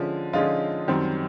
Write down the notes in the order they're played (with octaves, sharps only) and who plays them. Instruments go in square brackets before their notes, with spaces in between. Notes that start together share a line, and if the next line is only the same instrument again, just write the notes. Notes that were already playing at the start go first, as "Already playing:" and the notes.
Already playing: [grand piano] D3 F3 G#3 C#4
D3 F3 G#3 C#4 D#4 F4
F#2 D#3 G3 C4